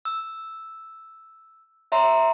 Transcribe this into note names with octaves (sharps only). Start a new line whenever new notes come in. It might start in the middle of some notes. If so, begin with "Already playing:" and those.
E6
C#5 E5 A#5 C6